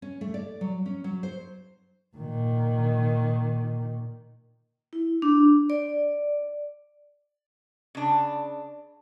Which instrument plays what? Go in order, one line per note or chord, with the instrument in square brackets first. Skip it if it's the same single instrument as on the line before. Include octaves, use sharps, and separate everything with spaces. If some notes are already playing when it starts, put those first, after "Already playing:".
[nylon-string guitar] C#4
A3
D5
F#3
C#4
F#3
C5
[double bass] A#2 D#3
[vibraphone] E4
D4
D5
[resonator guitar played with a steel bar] C#3 D4